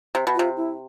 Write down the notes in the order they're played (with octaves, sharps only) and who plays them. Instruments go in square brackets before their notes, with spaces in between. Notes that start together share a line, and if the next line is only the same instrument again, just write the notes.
[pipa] C3
B2
[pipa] C3 [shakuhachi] F4
[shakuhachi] E4